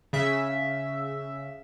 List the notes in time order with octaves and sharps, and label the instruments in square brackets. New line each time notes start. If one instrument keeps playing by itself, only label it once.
[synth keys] C#3 E5